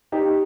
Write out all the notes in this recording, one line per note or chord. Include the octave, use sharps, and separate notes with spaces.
D#4 G4